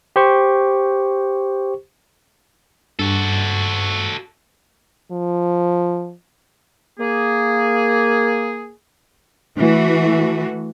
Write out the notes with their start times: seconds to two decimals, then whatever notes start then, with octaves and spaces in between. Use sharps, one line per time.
0.16 G4 C5 C#6
2.99 G2 F#4 A4
5.12 F3
6.99 A#3 G#4
9.56 E3 A3 F#4